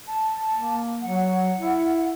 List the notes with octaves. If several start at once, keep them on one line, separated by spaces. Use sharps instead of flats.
A5
A#3
F#3 F#5
E4